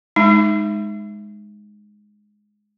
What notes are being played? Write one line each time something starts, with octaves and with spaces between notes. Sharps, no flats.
G#3 D#4